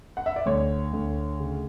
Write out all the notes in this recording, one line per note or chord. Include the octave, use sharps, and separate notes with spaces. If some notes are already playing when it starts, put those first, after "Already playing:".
F#5
E5
D5
D2 C#5
D2
C#3